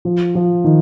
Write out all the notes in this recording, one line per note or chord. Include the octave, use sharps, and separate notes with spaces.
F3
F3
D#3